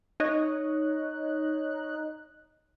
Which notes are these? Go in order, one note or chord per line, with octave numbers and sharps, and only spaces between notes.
D#4 C#5 D#5 F#6